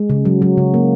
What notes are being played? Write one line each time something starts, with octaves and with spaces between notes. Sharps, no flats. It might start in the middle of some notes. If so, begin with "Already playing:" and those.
Already playing: G#3
C#3
F#3
F#3
C#3
A#3